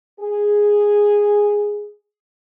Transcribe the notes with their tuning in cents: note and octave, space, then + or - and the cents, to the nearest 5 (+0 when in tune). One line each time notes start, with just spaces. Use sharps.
G#4 -5